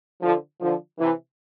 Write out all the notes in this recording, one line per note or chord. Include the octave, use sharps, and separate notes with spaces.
D3 F3
D3 F3
C3 E3